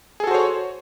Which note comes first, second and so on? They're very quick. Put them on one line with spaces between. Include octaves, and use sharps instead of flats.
G#4 A4 F#4 C5 C#5